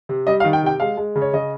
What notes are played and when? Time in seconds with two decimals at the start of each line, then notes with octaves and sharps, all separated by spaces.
0.09 C3
0.27 G3 D#5
0.40 F5
0.45 D#3
0.53 G5
0.63 C3 G5
0.80 G#3 F5
0.97 G#3
1.16 C#3
1.22 C#5
1.33 C#3 D#5